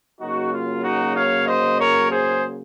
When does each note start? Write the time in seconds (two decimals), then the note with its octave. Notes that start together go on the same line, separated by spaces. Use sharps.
0.20 C#3 F#3 A#3 D#4 F#4
0.53 F4
0.84 D#4 F#4
1.15 C#5 F5
1.47 C5 D#5
1.79 A#4 C#5
2.10 G#4 C5